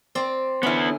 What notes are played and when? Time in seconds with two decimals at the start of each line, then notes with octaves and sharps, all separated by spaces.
0.15 C4 D5
0.63 D3 B3 C#4 E4